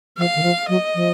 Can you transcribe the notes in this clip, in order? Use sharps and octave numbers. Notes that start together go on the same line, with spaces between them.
F3 F5
D#3
F3
F#3 D#5
F3